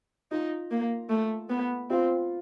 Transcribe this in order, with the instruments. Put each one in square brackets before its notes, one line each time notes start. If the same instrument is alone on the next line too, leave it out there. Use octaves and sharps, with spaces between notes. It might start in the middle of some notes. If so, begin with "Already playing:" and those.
[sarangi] D#4 [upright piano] F4
[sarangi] A#3
A3
B3
[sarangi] C4 [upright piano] F4